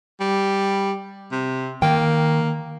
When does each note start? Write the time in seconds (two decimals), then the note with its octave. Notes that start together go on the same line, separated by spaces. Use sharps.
0.20 G3
1.32 C3
1.82 D#3 A#3 G5